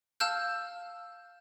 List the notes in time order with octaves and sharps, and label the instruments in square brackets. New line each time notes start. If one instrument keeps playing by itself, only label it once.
[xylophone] F5 A5 E6 F6 G6